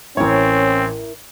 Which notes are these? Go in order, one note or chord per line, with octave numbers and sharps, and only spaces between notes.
A1 C4 C#4 E4 A#4 C#5